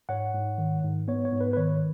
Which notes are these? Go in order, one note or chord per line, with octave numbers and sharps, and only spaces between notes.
G#2 C#5 F#5
G#2
D#3
G#2
B3 C#5
C#5
G#2
B4
B4
D#3 C#5